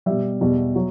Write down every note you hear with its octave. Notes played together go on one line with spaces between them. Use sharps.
B2 G3 E5
E2 B2 G3
F#3